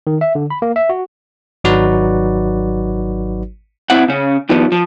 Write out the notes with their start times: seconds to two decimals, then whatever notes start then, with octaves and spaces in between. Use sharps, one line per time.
0.07 D#3
0.21 E5
0.35 D3
0.50 B5
0.62 A#3
0.76 E5
0.89 F#4
1.64 G#1 F#3 D#4 F#4 B4 D5
3.90 C4 E4 F#5
4.08 C#3 C#4
4.49 D#3 F3 G3 B3
4.72 F3